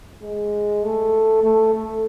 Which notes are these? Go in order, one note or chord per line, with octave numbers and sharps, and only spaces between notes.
G#3
A3
A3
A3